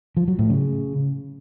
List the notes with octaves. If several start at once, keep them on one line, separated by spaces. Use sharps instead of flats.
F3
F#3
A2
C#3